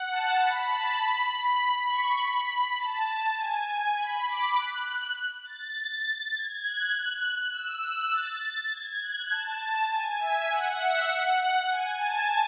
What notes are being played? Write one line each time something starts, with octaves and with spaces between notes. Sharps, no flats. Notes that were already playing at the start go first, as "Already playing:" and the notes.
Already playing: F#5
A5
B5
A5
B5
C#6
B5
B5
A5
G#5
G#5
B5
D6
F#6
A6
G#6
F#6
E6
F#6
A6
A6
G#6
F#6
A5
G#5
E5
F#5
E5
F#5
F#5
G#5
A5